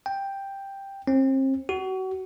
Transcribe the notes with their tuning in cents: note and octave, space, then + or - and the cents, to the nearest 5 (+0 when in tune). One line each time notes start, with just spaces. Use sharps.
G5 +5
C4 +35
F#4 +30